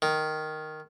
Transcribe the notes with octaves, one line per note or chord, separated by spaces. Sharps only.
D#3